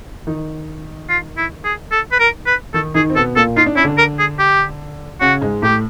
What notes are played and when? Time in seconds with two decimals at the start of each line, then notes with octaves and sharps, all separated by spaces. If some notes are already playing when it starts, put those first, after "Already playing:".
0.27 D#3 D#4
1.09 F4
1.37 E4
1.65 G#4
1.92 A4
2.12 B4
2.20 A#4
2.47 B4
2.74 D#3 D#4 A4
2.94 D#3 D#4 G#4
3.10 C4
3.16 B2 B3 A4
3.36 A#2 A#3 A4
3.57 D#4 F4
3.66 D4
3.75 C#4 E4
3.84 D3 D4
3.98 A#4
4.19 G#4
4.39 G4
5.21 C#3 C#4 F#4
5.41 G#2 G#3
5.62 A2 A3 G4